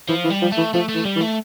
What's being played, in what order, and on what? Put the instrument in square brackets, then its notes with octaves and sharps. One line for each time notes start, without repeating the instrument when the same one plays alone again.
[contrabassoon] E3 [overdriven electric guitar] F3
[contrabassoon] E3
[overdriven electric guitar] G3
[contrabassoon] F3
[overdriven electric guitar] A3
[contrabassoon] E3
[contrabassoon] F3 [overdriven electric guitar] A3
[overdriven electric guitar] A3
[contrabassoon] E3
[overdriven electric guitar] G3
[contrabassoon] E3
[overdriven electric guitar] A3